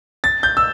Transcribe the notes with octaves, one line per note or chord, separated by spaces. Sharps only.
A6
G6
E6